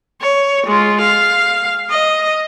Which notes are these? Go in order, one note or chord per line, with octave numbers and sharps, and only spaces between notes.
C#5
G#3 F4
F5
D#5